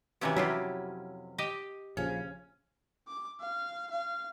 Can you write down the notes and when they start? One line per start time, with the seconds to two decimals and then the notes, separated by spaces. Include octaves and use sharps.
0.21 F2 C3 E3 C#4 F#4 G4
0.36 F#3 E4 F4 G4
1.38 G4 D#5
1.97 A#1 C#3 F3 C#4
3.07 D6
3.40 F5
3.91 F5